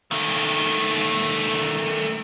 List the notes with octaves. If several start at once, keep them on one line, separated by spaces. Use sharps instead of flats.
D#3 A3